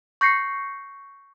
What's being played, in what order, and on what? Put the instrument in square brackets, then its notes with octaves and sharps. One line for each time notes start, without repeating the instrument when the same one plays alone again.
[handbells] C#6 G6 A#6 C7 C#7